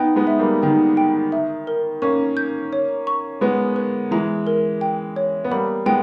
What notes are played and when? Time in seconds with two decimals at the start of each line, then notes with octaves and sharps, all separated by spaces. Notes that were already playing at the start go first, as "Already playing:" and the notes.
Already playing: B3 D#4 G5
0.16 G#3 B3
0.27 E5
0.39 G3 A#3
0.63 D#3 G5
0.97 G5
1.32 E5
1.67 A#4
2.02 A#3 C#4 C#6
2.37 G6
2.73 C#5
3.07 C#6
3.41 G#3 B3 B4
3.76 B4
4.11 E3 G#3 A#5
4.47 A#4
4.81 G5
5.16 C#5
5.44 B3
5.51 G3 A#3 B5
5.86 G#3 B3 G5